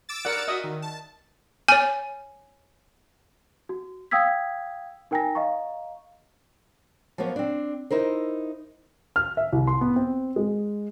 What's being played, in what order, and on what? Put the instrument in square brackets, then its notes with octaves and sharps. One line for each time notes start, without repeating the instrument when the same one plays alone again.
[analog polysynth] D6 E6 A6
[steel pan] A#4 D5 F#5
[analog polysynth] F#4 [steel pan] D#5 E5 D#6
[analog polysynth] D#3
A5
[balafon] C#5 G#5
[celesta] F#4
F5 G5 D#6 E6 G#6 B6
D#4 A#4 G5 G#5 A#5 A#6
D#5 F5 A#5 C#6
[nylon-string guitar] F3 F#3 A#3 B3 C#5
C4 D4
D#4 E4 A#4 C5
[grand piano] F6
E5
C2
C6
B3
C4
G#3